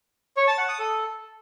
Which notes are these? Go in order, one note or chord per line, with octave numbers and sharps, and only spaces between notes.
C#5
A5
F#5
D#6
A4